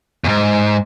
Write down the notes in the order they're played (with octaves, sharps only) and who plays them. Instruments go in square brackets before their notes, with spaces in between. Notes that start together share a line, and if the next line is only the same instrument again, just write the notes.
[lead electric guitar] E2 G#2